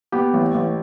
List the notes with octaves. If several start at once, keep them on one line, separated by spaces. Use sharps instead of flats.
B3 G4
A1
A1